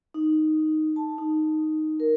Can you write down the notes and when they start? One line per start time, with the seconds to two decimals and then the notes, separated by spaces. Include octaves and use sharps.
0.14 D#4
0.96 A5
1.18 D#4
2.00 A#4